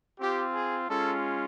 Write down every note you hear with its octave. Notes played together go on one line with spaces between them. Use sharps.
C4 F4 G4
G#4
G#3 C#4 F4 A4